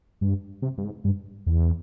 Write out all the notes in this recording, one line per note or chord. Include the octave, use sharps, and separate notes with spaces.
G2
C3
G2
G#2
G2
E2